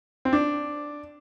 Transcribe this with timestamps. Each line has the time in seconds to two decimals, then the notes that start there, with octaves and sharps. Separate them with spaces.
0.25 C4
0.33 D4